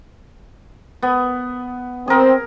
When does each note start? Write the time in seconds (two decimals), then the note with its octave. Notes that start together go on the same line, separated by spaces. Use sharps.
1.03 B3
2.08 C4 G#4 A#4